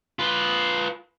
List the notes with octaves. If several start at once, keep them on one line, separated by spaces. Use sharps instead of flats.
F4 B4